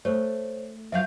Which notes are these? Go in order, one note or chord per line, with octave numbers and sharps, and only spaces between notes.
A3 C5 C#5
F3 F#3 E5 F5 G6